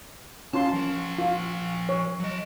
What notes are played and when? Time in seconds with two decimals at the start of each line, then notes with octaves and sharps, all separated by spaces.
0.53 C#4 F4 A5 C6
0.73 F3 A#4
1.18 F4
1.89 C#5
2.20 F#3 D#5